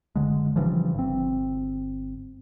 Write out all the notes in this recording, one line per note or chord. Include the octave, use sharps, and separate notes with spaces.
F#1 C2 D3 G#3
G2 C#3 E3 F3
G1 C4